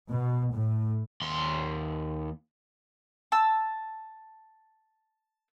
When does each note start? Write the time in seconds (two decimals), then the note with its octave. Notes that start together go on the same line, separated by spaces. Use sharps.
0.10 B2
0.53 A2
1.22 D#2 C6
3.32 A5 E6